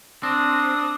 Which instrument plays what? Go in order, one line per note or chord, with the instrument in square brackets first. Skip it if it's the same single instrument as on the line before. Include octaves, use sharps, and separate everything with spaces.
[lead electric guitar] C4 [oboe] D4 [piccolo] D#6